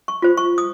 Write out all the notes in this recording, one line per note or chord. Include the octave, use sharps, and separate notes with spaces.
C#6
F4 C5
C#6
D#6